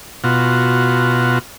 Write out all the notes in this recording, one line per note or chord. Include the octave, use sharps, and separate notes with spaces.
B2 F4 F#4